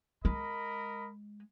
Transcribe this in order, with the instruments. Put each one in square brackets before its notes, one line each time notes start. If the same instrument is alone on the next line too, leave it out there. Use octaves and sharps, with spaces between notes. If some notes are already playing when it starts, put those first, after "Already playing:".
[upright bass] G#3 [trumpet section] A#4 D#5 B5